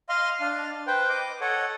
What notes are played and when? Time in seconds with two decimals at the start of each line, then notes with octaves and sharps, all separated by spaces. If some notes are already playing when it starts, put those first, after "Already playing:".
0.09 D#5 F5 C6
0.40 D4 F5
0.87 B4 C5 G5
1.09 D#5 D6
1.41 A4 C#5 D#5 F#5